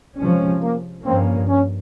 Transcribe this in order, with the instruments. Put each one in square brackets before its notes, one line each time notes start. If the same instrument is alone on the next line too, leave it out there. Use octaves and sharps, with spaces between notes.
[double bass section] C3 F3 G#3 C#4
[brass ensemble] A#3
[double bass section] G2 F3 A#3 C#4 [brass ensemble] C4
[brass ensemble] C#4